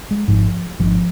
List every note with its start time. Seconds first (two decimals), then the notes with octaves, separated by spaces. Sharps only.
0.11 G#3
0.28 G#1 G#2 F3
0.79 G#1 G#2 F3